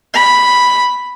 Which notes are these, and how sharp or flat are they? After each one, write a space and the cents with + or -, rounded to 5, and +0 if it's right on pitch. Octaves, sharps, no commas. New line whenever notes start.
B5 +0